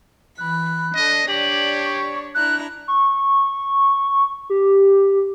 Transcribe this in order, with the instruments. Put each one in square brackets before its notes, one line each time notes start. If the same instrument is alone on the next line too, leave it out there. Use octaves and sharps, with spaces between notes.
[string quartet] E3 B5 [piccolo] F#6
[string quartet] D4 A4 [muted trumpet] D#5
[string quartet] D4 C#5 D5 [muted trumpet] G4 [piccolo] F#7
[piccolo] C#6
[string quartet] D4 E4 A#5 [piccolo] F#6
[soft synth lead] C#6
G4